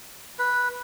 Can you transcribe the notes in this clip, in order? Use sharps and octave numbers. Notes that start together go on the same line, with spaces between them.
B4